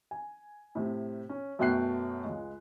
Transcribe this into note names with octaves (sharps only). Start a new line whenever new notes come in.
G#5
A2 C3
C#4
F#2 B2 A3 G5 F#6 C7
C#2 G#3